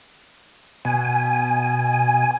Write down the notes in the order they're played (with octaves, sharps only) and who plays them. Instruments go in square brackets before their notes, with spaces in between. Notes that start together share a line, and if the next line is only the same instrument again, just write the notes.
[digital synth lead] B2 [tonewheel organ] G#5